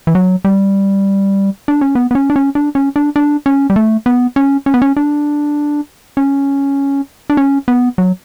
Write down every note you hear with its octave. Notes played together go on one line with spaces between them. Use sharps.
E3
F#3
G3
D4
C#4
B3
B3
C#4
D4
C#4
D4
C#4
D4
D4
C#4
G3
A3
B3
C#4
C#4
B3
C#4
D4
C#4
D4
C#4
B3
F#3